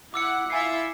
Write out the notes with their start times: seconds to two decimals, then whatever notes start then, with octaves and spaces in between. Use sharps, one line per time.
0.14 E4 F#5 D6 E6 C#7
0.50 E4 F4 E5 G#5 C7